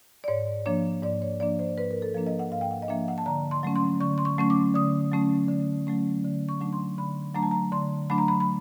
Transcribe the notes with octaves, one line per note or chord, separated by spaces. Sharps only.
D5
G#2 C#5
F3 A#3 D4 C#5
G#2 D5
C#5
F3 A#3 D4 D5
C5
G#2 B4
A#4
A4
F3 A#3 D4
D#5
F#5
G#2 F5
G5
F#5
D#5
F3 A#3 D4 E5
F#5
A5
D3 A#5
C6
F#3 A3 C#4
C6
D3 C#6
C6
C#6
F#3 A3 C#4 C#6
D6
D3 D#6
F#3 A3 C#4
D3
F#3 A3 C#4
D3
C#6
F#3 A3 D4
C6
D3 B5
F#3 A3 D4 A#5
A5
A#5
D3 C6
F#3 A3 D4 B5
A#5
B5
B5